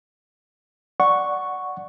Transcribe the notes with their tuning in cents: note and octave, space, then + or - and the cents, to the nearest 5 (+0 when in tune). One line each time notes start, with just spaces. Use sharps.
D5 +0 F#5 +0 C#6 +0